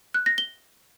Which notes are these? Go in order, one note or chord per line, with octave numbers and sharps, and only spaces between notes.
F#6
A#6
G7